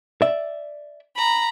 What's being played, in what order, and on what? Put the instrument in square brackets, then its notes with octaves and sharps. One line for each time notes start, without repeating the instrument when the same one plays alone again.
[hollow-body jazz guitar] D5 E5
[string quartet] A#5 B5